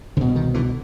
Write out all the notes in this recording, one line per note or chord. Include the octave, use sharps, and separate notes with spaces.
C2 B2 D3
D#3
D3 E3